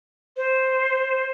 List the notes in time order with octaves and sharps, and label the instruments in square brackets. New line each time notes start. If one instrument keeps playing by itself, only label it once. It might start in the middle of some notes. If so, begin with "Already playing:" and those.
[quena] C5